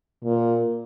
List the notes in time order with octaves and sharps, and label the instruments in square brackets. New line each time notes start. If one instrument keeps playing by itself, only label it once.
[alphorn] A#2